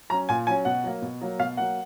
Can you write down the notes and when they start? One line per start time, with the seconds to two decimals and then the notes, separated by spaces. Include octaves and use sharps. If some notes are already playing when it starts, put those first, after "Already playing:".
0.10 F#3 A#5
0.14 C#4
0.29 A#2 G#5
0.47 F#3 C#4 G#5
0.65 B2 F#5
0.84 F#3 A#3
1.02 B2
1.21 F#3 A#3
1.39 B2 F5
1.57 F#3 A#3 F#5